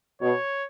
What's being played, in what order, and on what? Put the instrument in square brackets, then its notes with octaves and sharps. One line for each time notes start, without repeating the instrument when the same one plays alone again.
[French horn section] B2 [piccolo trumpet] C#5